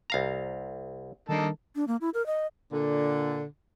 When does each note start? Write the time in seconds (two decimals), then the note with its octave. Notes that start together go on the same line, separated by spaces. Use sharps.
0.10 C2 F5 A#5
1.29 D#3 G3 A#3 D4 D#4 A4
1.76 D4
1.88 A#3
2.01 E4
2.14 A#4
2.26 D#5
2.72 A#2 D3